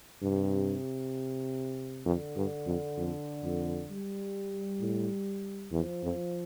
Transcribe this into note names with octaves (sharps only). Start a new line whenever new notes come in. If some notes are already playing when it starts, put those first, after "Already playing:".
G2 C3
F2 D3
G2
F2
F2
F2
G3
A2
E2 F3
F2